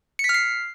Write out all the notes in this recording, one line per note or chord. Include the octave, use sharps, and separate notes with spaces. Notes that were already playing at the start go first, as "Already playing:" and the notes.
C#7
B6
F6
C7